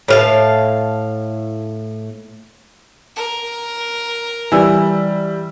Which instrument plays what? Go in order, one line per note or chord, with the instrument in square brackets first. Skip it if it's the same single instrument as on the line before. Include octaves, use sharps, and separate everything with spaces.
[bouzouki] A2 F5 A5
[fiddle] A#4
[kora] E3 [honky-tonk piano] G3 E6